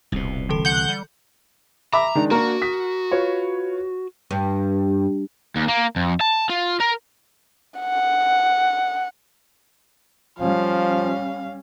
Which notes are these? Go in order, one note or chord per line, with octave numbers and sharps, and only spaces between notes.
D#1 C2 B2
D3 E3 A4
F#5 G6
G3
E5 A#5 B5 D6
D#3 G#3 D4
A#3 D4 F#4 A#4
D#6 B6
F4 B4 C#5
G2
D#2
A#3
F2
A5
F4
A#4
F#5
F3 G3 C#4 F5